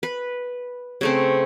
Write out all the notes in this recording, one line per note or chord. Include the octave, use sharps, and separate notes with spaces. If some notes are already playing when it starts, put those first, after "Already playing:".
B4
C#3 A3 C4